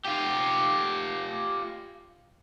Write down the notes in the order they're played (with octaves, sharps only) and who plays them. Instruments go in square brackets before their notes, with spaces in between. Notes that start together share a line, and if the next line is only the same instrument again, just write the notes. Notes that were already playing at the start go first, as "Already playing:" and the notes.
[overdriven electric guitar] F4 G4